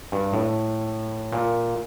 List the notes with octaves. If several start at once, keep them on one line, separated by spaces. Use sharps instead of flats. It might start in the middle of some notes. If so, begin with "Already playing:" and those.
G2
A2
A#2